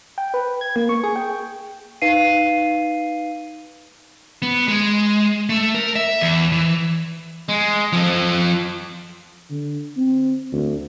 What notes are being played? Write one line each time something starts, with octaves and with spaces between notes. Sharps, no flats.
G5
B4
G#6
A#3
C#6
G#4
G5
D#4 B4 F5 C7 D#7
B3
G#3
A3
A#4
E5
E2
E3
G#3
F3 A4
D3
C4
D2